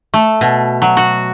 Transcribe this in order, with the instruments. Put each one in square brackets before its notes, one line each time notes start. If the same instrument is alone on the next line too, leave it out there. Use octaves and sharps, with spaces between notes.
[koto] A3
B2
F#3
F#4